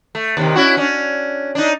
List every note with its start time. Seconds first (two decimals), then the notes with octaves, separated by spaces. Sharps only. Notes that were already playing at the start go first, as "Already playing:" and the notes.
0.15 A3
0.37 D#2 C3 D#3
0.56 C#4 E4 F#4
0.77 C#4 D4
1.55 D4 D#4